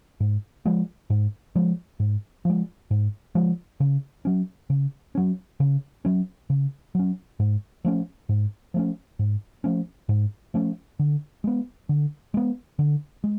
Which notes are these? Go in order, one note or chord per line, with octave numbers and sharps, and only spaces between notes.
G#2
F3 G#3
G#2
F3 G#3
G#2
F3 G#3
G#2
F3 G#3
C#3
F#3 C#4
C#3
F#3 C#4
C#3
F#3 C#4
C#3
F#3 C#4
G#2
F3 A3 C#4
G#2
F3 A3 C#4
G#2
F3 A3 C#4
G#2
F3 A3 C#4
D3
G#3 B3
D3
G#3 B3
D3
G#3